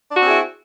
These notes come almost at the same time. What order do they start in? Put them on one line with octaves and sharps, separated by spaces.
D4 F#4 C4 G#4 E4